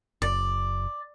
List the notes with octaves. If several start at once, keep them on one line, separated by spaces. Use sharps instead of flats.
F#1 D5